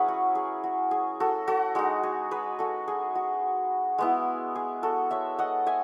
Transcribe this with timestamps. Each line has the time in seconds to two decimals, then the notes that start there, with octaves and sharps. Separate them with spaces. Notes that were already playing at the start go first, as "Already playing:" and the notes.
Already playing: F#3 C#4 E4 G#4 B4 F#5
0.08 F#4
0.35 G#4
0.64 F#4
0.91 G#4
1.20 F#4 A4
1.47 F#4 A4
1.75 G#3 D#4 F#4
2.03 G#4
2.31 G#4 B4
2.59 F#4 A4
2.88 G#4
3.15 F#4
3.98 G#3 B3 E4
4.55 G#4
4.83 F#4 A4
5.11 C#5 E5
5.39 D#5 F#5
5.66 E5 G#5